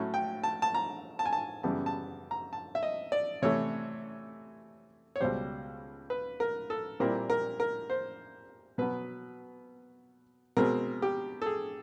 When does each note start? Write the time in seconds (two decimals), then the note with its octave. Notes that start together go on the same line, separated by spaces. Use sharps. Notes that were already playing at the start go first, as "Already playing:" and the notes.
Already playing: A2 F#3 A3 C#4 E4
0.14 G5
0.43 A5
0.62 A5
0.74 A#5
1.19 A5
1.26 G#5
1.33 A5
1.63 F#2 C#3 E3 G3 B3 A5
1.86 A5
2.31 A#5
2.53 A5
2.75 E5
2.83 D#5
3.12 D5
3.42 C3 E3 A3 C#5
5.16 C#5
5.20 C#2 B2 G3 C5
6.10 B4
6.40 A#4
6.70 A4
7.00 A#2 G3 C4 E4 A#4
7.30 A#4
7.60 A#4
7.90 C5
8.78 B2 F#3 B3 B4
10.57 B2 G#3 C4 A#4
11.02 G4
11.42 A4
11.46 G#4